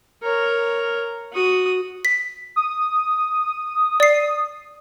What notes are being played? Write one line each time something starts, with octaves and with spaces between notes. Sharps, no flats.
A#4 C#5
F#4 D#6
B6
D#6
D5 C7